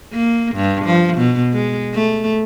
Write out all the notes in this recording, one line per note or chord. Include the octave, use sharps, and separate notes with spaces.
A#3
G2
F3
B2
G#3
A3